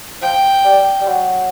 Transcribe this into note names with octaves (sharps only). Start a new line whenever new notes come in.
F3 G5
G3
G3
F#3